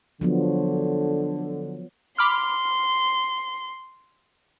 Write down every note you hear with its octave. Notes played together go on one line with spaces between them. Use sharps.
D3 F3 F#3 B3
B5 C6 D6 F6